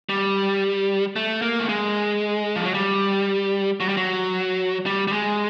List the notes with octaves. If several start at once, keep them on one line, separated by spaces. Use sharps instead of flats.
G3
A3
A#3
A3
G#3
F3
F#3
G3
F#3
G3
F#3
G3
G3
G#3